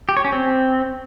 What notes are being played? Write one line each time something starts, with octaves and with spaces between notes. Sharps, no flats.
G4
C#5
C#4
C4